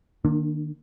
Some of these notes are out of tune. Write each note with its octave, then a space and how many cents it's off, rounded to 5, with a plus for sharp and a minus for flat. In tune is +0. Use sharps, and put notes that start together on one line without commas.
D#3 -35 A#3 +0 D4 +20